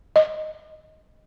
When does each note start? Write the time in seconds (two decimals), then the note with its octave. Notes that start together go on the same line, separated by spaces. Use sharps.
0.16 D#5